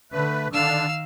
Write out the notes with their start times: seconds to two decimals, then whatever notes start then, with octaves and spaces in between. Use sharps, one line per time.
0.12 D3 A3 B4
0.53 D3 D#3 D4 F5 E6